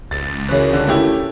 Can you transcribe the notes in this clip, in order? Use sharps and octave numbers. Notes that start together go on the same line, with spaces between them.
C#2 A6
C#3 E3 C#4 F#4 A#4 B4
D3
A3 E4 G4